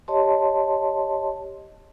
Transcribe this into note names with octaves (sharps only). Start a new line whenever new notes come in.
G4 C#5 D#5 A5 C6